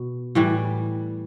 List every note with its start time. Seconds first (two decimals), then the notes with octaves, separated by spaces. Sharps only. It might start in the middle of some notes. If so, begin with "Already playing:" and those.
Already playing: B2
0.35 A2 E3 G3